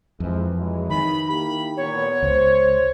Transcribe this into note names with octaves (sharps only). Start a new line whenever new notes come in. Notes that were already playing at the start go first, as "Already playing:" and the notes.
F2 E3 F3 G#3
E3 F#3 G#3
D#3 B5
A#3 E4 G4 B5
A#2 A#3 B3 C#5
C#2 C5